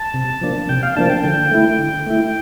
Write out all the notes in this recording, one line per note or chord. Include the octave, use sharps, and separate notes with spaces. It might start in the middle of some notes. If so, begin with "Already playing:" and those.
Already playing: A5
C3
F3 A#3 D4
C3 G5
F5
F3 A#3 D4 A5
G5
D3 G5
A3 E4
D3
A3 E4